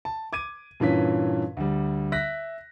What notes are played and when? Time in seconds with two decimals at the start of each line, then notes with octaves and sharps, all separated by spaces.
0.05 A5
0.33 D6 G#6 D#7
0.80 G2 A#2 E3 C#4 B6
1.57 D2 G3
2.12 E5 F#6 A#6 B6